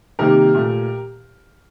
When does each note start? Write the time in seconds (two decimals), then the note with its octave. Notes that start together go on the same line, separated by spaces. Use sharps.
0.19 C3 D#3 G3 A#3 G4 A#4
0.54 A#2 A3